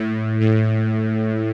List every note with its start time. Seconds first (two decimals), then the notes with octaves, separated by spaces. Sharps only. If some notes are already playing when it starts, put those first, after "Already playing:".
Already playing: A2
0.41 A2